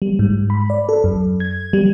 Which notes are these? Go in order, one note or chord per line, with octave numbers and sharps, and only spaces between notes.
G3
G#2
B5
D5
A4
F#2
G#6
G3